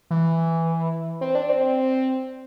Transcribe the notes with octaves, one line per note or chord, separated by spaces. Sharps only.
E3
C4
D4
C4